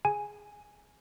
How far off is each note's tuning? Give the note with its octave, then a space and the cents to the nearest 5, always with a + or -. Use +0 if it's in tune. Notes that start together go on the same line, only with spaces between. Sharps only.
G#4 +0 G#5 +0